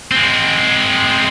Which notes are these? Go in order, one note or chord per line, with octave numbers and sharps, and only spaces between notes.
G#3 C4